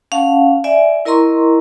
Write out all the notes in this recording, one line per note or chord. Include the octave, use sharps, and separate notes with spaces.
C#4 F5 F#5 A5
D5 E5 G#5
E4 A#4 D#5 A#5 C6 C#6